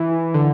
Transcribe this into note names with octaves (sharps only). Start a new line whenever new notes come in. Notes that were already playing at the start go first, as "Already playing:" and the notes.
Already playing: E3
D3